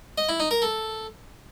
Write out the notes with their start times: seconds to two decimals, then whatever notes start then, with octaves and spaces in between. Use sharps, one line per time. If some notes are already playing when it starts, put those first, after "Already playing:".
0.18 D#5
0.29 E4
0.40 D#4
0.51 A#4
0.62 A4